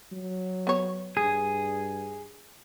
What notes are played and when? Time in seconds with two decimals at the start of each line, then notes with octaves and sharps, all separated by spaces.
0.12 F#3
0.67 B3 C#5
1.17 G2 G#4